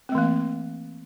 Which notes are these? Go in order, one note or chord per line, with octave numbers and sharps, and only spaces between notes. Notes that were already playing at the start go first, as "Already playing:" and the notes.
E3 A3 A#3 C4